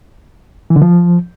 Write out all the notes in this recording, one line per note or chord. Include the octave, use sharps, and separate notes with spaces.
E3
D3
F3